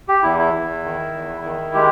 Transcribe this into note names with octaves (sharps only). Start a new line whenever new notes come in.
G4
E2 E4
E4
E2
D#3
E2
D#3
G#3 G4